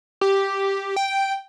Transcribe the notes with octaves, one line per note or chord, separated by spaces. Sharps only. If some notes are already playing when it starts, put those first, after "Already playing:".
G4
G5